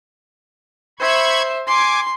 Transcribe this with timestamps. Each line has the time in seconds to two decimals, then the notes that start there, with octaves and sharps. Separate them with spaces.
0.99 C5 E5 B5 C#6 G#6
1.67 G#5 C6 D6